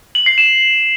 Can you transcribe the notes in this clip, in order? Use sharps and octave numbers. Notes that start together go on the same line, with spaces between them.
F#7
C7
E7